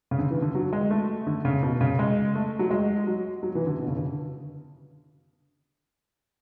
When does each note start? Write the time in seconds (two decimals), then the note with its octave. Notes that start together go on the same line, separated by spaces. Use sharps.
0.11 C#3
0.19 D3
0.31 E3
0.42 D3
0.55 F#3
0.73 G#3
0.91 A3
1.27 D3
1.45 C#3
1.63 B2
1.81 C#3
1.99 G#3
2.35 A3
2.59 F#3
2.71 G#3
3.07 F#3
3.43 F#3
3.55 E3
3.67 D3
3.79 B2
3.88 C#3
3.97 D3